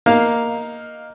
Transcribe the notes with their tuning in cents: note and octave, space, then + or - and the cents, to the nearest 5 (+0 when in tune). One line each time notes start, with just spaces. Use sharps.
A#3 +0 D#4 +0 F5 +0